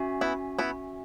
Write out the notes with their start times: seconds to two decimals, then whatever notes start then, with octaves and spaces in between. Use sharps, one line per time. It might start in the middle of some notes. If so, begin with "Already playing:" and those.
Already playing: C#4 F#4 E5 G#5
0.21 B3 E4
0.59 B3 E4